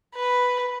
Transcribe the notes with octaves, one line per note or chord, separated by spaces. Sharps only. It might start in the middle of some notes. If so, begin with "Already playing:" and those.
B4